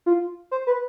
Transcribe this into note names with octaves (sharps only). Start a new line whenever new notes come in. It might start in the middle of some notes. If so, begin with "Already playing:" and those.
F4
C5
B4